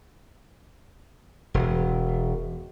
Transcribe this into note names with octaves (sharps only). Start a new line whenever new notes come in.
E1